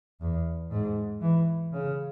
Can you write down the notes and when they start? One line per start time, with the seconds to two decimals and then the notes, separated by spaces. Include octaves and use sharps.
0.21 E2
0.71 G#2
1.21 E3
1.72 C#3